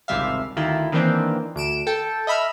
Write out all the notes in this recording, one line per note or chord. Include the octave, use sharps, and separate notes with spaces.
G#1 C#2 C3 G3 E5 F5
D2 D#3 E4 F4
D#3 E3 A#3 C4 D4
D2 D7 E7
A4 G5 A5
D#5 E5 B5 E6 F6